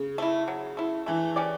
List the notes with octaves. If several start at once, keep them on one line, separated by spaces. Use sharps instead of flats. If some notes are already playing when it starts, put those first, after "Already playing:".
Already playing: C#3
A3 E4
F#3
A3 E4
E3 A3
C#4 G4 D5